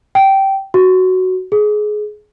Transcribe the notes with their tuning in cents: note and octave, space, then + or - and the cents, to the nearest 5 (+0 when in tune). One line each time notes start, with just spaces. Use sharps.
G5 -15
F#4 +5
G#4 +20